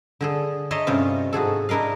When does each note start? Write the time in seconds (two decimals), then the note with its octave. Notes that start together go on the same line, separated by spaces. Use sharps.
0.21 D3 G#4 A4
0.71 C#5 D#5 E5 A5 A#5 C6
0.87 G2 C3 C#4 F4
1.33 G#2 F#4 G#4 A4
1.69 D4 E4 A#4 D#5 F5